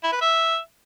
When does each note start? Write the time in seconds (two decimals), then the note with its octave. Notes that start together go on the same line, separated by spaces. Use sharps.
0.03 E4
0.12 B4
0.21 E5